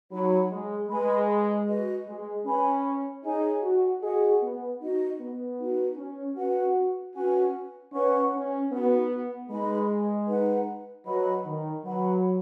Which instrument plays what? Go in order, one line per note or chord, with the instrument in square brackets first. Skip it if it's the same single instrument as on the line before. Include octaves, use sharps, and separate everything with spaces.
[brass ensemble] F#3 [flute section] D#4 F#4 C#5 B5
[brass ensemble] G#3
[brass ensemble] G#3 [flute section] G#4 B4 G#5 B5
[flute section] F#4 B4 D#5
[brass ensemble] G#3
[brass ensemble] C#4 [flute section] B4 G#5 B5
[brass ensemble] D#4 [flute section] G#4 C#5 G#5
[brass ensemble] F#4
[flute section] F#4 D#5 F#5 [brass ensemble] G#4
[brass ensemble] B3
[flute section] D#4 F#4 D#5
[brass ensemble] B3
[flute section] D#4 F#4 B4
[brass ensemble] C#4
[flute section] C#4 B4 F#5 [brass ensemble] F#4
[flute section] C#4 B4 G#5 [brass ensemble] F#4
[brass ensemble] C#4 [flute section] B4 F#5 C#6
[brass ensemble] C#4
[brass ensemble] B3 [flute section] D#4 F#4 B4
[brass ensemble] G#3 [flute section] D#4 B4 D#5 B5
[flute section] D#4 B4 F#5
[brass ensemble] F#3 [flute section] B4 D#5 B5
[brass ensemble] D#3
[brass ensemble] F#3 [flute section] B4 F#5 B5